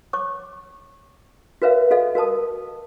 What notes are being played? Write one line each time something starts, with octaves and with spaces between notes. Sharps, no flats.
C#5 C#6 D6
F#4 A#4 B4 C#5 E5 F5
F#4 A4 D#5 F5
F#4 A#4 A5 D#6